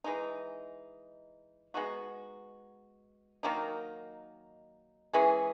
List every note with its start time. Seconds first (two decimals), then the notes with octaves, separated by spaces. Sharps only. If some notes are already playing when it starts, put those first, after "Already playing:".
0.04 E3 G#3 D#4
1.74 G#3 B3 D#4 F#4
3.43 D#3 F#3 A#3 D#4
5.13 E3 G#3 C#4 G#4